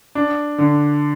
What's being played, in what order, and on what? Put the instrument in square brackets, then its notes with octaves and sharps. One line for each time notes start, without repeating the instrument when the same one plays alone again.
[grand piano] D4
D3